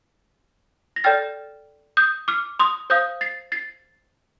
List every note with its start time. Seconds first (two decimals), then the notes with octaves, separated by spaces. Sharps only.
0.96 A#6
1.04 A4 D5 G5 F6 A6
1.97 D#6 G6
2.28 D6 F6
2.59 C6 D#6
2.90 C5 F5 D#6 G6
3.21 A6 C7
3.52 A6 C7